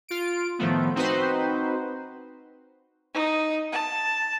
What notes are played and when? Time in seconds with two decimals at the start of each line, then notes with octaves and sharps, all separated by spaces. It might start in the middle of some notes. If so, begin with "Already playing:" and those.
0.08 F4 D7
0.59 A2 D#3 F3 A3 B3
0.95 C4 D#4 F#4 B4 C5
3.14 D#4
3.72 A5